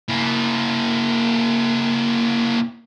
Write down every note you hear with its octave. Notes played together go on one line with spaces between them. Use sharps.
A#3 E4